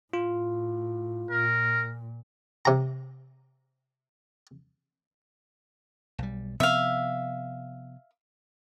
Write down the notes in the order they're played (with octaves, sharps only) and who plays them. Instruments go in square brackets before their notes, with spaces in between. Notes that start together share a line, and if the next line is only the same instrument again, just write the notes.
[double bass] A2 [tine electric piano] F4
[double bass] A#2 [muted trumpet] A#4
[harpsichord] C3 A#5
[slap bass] B1 G3
[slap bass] C3 F3 B3 [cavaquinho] E5 F5